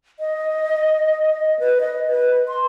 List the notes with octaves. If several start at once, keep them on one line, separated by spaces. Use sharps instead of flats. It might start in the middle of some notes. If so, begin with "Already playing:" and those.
D#5
B4
D#5
B4
C6